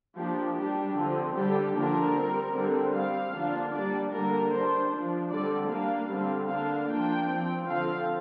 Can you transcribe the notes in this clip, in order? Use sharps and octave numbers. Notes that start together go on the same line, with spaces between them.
F3 A#3 D4 G4
G3 D4 G4
D3 F3 C4 F4
D3 G3 D4 G4
D3 F3 A#3 D4 A#4
G3 C4
D3 G3 C4
G3 C4 F5
D3 F3 A#3 D4
G3 A#3 D4 D5
D3 G3 A#3 D4 A#4
G3 D4 C5
F3 D4
D3 G3 C4 D5
G3 A#3 D4 F5
D3 G3 C4
D3 A#3 D4 F5
F3 A#3 D4 G5
F3 C4
D3 F3 C4 F5